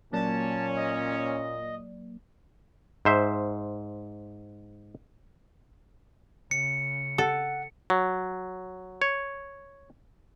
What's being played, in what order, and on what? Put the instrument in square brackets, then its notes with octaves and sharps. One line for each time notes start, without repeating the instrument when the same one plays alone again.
[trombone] A#2 [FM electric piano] F#3 A#3 D5 [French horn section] C#4 [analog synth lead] A5
[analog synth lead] D#5
[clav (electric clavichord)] G#2 C5 E5
[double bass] C#3 [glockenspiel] C#7
[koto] A4 [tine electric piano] F#5
[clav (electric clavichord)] F#3
C#5